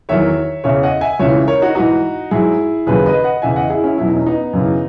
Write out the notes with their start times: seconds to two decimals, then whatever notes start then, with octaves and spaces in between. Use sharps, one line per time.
0.09 E2 D#3 F#3 C#5 E5
0.64 E2 C#3 E3 C#5 E5
0.83 D#5 F#5
1.01 E5 G#5
1.19 C#2 C#3 E3 C#5 E5
1.47 A#4 C#5
1.62 D#4 F#4
1.75 G#2 E3 D#4 F#4
2.31 G#2 F#3 E4 G#4
2.86 D#2 C#3 F#3 G#4 B4
3.06 B4 D#5
3.23 D#5 F#5
3.42 E2 C#3 E3 E5 G#5
3.56 D#5 F#5
3.70 E4 G#4
3.84 C#4 E4
3.98 E2 B2 F#3 E4
4.08 D#4
4.16 C#4
4.26 B3 D#4
4.53 F#2 C#3 E3